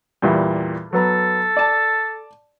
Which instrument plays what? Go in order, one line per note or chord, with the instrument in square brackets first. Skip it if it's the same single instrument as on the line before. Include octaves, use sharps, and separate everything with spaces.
[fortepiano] E2 A#2 G3
[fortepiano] F#3 B3 A#5 [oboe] A4
[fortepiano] D5 A5